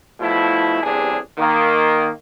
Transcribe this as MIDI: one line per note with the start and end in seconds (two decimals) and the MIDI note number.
0.20 0.80 47
0.20 0.80 53
0.20 0.80 57
0.20 0.80 64
0.82 1.17 33
0.82 1.17 40
0.82 1.17 43
0.82 1.17 48
0.82 1.17 62
0.82 1.17 68
1.38 2.09 51
1.38 2.09 58